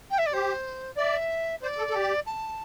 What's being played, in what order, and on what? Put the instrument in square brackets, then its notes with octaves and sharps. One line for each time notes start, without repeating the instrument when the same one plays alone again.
[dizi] G5
E5
D5
[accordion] G4 [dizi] C5
[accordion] D5 [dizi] E5
[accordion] C5 [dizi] D5
[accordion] A4
A4
G4
[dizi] A5